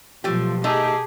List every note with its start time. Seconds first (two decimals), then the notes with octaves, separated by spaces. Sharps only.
0.24 B2 F3 F#3 A3 F4 G4
0.64 A3 D#4 G4 G#4 A5